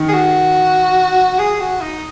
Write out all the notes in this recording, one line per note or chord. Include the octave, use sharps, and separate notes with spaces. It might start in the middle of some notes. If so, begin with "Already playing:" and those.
Already playing: D#3
G#4
F#4
G#4
F#4
D#4